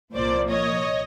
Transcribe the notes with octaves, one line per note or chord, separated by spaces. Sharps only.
C2 A#2 F3 A#3 C5 D5
C#5 D#5